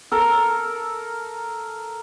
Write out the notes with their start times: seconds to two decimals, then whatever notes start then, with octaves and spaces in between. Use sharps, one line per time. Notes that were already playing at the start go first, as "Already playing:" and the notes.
0.11 A4 A#4